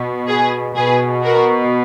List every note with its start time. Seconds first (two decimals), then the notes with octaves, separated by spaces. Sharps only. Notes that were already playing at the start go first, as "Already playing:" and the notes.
Already playing: B2
0.28 G#4 B4
0.76 B2 G#4 B4
1.24 F#4 A#4